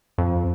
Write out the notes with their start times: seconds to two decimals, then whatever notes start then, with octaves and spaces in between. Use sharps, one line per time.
0.18 F2